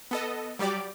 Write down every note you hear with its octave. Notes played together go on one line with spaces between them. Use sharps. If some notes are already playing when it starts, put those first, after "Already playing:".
B3 A4 D#5
F#3 G3 G4 D5 D6